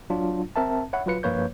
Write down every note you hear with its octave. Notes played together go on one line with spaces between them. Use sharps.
F#3 D4 F4
C4 A#4 E5 A5
C#5 E5 F#5 B5
F#3 F4 B4 C#7
G2 F3 A#3 B4 C#5 G6